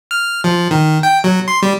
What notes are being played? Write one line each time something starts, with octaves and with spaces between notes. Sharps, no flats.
F6
F3
D#3
G5
F#3
C6
G3